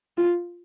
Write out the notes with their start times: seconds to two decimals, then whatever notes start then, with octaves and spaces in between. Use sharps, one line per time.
0.17 F4